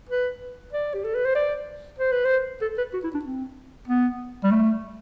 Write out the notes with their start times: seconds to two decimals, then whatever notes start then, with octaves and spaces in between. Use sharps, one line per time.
0.09 B4
0.73 D5
0.94 G4
1.04 A4
1.15 B4
1.25 C5
1.35 D5
1.99 C5
2.12 B4
2.25 C5
2.61 A4
2.78 B4
2.94 F#4
3.04 E4
3.14 D4
3.25 C4
3.88 B3
4.44 G3
4.51 A3